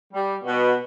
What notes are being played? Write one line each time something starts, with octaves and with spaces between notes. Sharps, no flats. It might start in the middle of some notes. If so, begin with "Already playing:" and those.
G3
B2